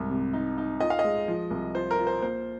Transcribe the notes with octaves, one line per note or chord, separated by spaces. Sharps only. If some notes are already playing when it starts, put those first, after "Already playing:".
Already playing: C2 G#2
C3
D#4
D#4
F4 D#5
F5
D#5
G#3
F3
C2
F4 C5
A#4
F4
C5
A#3 C5